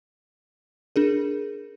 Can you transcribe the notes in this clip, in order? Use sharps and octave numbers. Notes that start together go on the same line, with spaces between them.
D4 G#4 A#4